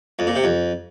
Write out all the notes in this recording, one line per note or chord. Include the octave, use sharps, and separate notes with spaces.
F2
A#2
C3
F2